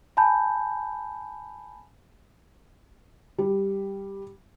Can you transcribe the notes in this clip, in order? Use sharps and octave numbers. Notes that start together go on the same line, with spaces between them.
G#5 A5 B5 G6
G3